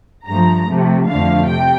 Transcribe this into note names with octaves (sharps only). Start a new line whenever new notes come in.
G2 F3 A3 A#5
C3 F3 A3
F2 D3 F3 A3 F5
C3 G5